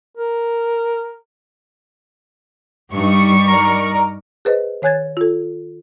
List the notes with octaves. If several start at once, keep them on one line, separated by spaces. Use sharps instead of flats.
A#4
G2 G3 D#4 C#6
D#4 A#4 D5 A#5
G#4 B4 C5 D#5
D#3 C#5 G#5 F#6 G#6 A6
F4 A4